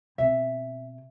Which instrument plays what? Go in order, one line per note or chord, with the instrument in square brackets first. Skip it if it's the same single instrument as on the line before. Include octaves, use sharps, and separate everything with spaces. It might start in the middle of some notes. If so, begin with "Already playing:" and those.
[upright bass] B2 C4 [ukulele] E5